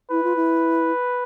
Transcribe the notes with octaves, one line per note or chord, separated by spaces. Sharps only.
E4 B4
F4
E4